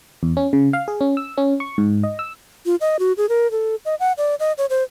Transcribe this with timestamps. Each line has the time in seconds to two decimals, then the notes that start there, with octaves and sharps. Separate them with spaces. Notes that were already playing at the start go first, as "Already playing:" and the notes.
0.23 E2
0.37 C#4
0.53 C#3
0.73 F5
0.88 G#4
1.01 C#4
1.17 E6
1.37 C#4
1.60 C#6
1.78 G#2
2.03 D#5
2.19 E6
2.66 F4
2.81 D#5
2.99 F#4
3.17 G#4
3.29 A#4
3.51 A4
3.85 D#5
4.00 F#5
4.18 D5
4.40 D#5
4.58 C#5
4.70 C5